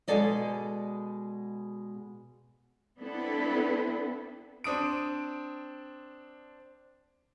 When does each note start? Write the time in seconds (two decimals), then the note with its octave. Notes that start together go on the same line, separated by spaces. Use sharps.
0.08 B2 G#3 G#4 A4 D5 D#5
2.99 B3 C4 D4 E4 A4 B4
4.64 C4 D4 D#6 D7